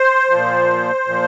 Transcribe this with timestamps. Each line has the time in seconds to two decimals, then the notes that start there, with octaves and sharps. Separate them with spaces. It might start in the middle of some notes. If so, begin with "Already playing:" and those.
Already playing: C5
0.30 A#2 F3
1.06 A#2 F3